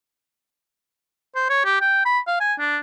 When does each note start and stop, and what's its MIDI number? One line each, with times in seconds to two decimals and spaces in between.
1.36 1.48 72
1.50 1.62 73
1.65 1.81 67
1.81 2.01 79
2.05 2.20 83
2.27 2.37 77
2.40 2.54 80
2.59 2.79 62